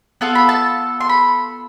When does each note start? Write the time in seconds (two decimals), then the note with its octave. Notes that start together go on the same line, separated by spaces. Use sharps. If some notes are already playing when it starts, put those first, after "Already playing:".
0.21 B3 F4 A4 A5
0.35 B5
0.49 A5
1.00 C6
1.09 B5